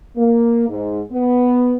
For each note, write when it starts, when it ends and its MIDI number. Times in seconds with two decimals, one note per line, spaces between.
0.16 0.66 58
0.69 1.00 44
1.12 1.75 59